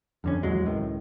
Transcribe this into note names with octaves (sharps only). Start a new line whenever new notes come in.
F2 D3 C#4
A#1 E2 F#3 G#3
C#2 A2 D#3